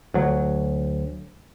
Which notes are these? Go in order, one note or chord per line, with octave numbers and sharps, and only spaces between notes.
D2 F#3